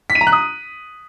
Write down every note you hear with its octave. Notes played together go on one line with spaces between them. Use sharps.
B6
D#7
A#5
F#6
D#6